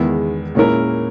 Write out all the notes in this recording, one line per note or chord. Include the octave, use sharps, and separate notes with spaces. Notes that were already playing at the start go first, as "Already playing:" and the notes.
Already playing: E2 D#3 G#3 B3 E4
A#2 G#3 C#4 E4 A#4